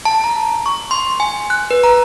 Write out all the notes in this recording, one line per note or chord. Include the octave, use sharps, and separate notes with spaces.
A5
A#5
C#6
C6
G#5
F#6
B4
A#5